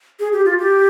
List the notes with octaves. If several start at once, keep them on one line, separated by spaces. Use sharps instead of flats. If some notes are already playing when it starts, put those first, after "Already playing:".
G#4
G4
F4
G4